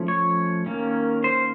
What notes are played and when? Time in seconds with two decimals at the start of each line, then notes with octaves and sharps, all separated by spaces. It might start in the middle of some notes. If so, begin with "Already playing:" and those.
Already playing: F3 A3 C#4
0.08 C#5
0.66 D#3 A#3 C#4
1.24 C5